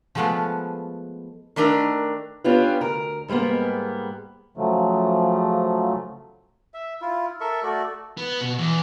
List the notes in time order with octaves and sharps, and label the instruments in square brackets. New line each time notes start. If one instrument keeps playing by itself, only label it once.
[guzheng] F3 G#3 A3 B3 F4 B4
[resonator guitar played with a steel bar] D#3 A3 D4 A#4
[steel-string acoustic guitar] B3 C#4 D4 F4 G4 B4
D2 A#4
G#2 G3 G#3 A#3 B3
[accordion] C#3 F3 F#3 A3
[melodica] E5
E4 F4
A4 A#4 E5 C#6
A3 F#4 A4 D5
[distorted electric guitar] B3
B2
E2